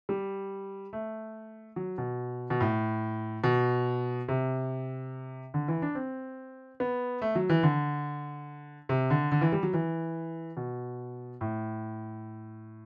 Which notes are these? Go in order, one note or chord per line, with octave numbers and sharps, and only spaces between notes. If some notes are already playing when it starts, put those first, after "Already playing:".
G3
A3
F#3
B2
B2
A2
B2
C3
D3
E3
D4
C4
B3
A3
F#3
E3
D3
C3
D3
D3
E3
G3
F#3
E3
B2
A2